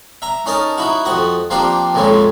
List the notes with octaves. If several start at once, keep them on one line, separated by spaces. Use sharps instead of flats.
E5 A#5
C#4 D#4 A#4 D#5 A5
D#4 E4 F#4
F2 F#4 D#5
F3 A#3 C4 D4 G4
F2 A#2 C#3 G#3 C#4